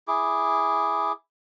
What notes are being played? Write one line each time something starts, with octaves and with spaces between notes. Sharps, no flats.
E4 G#4 D6